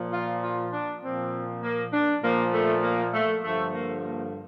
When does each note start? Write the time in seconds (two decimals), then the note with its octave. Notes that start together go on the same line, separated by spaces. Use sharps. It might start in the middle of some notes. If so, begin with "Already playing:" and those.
Already playing: A#2 F3
0.13 F4
0.43 F4
0.73 D4
1.03 A#2 F3 C4
1.63 A#3
1.93 D4
2.23 A#2 F3 A#3
2.53 A3
2.83 A#3
3.13 A3
3.43 G2 D3 F3 A3
3.74 A#3
4.04 A#3